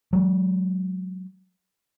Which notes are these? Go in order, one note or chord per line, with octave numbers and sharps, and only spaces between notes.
F#3 G#3